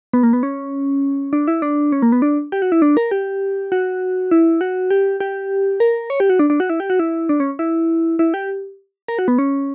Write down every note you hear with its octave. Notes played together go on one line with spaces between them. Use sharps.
B3
A#3
B3
C#4
D4
E4
D4
C#4
A#3
B3
D4
G4
F#4
E4
D4
A#4
G4
F#4
E4
F#4
G4
G4
A#4
C#5
G4
F#4
D4
D4
F#4
E4
G4
F#4
E4
D4
C#4
E4
E4
G4
A#4
F#4
B3
C#4